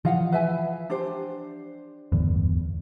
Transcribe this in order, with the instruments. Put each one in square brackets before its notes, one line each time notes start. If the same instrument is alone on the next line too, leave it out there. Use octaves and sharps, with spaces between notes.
[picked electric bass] E3 F3 [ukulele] D#5 F5 F#5
[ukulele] B4 E5 G#5
D4 G4 C5
[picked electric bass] D1 G1 E2